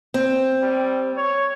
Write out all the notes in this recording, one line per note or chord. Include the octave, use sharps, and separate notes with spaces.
C4
G3
C#5